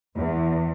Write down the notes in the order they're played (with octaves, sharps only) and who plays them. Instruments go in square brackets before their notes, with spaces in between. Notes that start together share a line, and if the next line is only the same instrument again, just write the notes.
[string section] E2